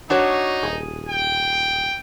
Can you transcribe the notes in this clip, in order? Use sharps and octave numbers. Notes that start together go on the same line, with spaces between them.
D4 D#4 F#4 C#5
D#1 G#4
G5